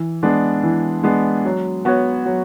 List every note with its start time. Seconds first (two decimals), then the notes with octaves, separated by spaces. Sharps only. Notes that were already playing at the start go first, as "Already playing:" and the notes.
Already playing: E3
0.23 G#3 B3 D4
0.63 E3
1.04 G#3 B3 D4
1.45 F#3
1.85 B3 F#4 C#5
2.26 F#3